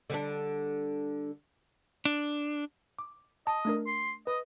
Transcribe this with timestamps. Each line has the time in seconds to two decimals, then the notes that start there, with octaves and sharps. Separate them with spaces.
0.10 D3 G3 D4
2.05 D4
2.99 D6
3.47 D#5 A5
3.65 A3 D4 A#4
3.87 C6
4.27 B4 D#5